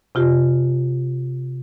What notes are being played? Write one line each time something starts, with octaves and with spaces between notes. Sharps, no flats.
C3 F4 G4